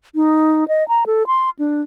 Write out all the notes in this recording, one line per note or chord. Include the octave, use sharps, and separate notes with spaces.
D#4
D#5
A#5
A4
C6
D4